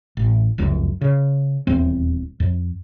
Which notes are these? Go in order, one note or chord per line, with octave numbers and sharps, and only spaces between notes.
A1
F1 C#2 F#2
C#3
D#1 E2 C4
F2